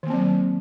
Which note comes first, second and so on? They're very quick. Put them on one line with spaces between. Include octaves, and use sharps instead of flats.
D#3 A#3 C4 F#3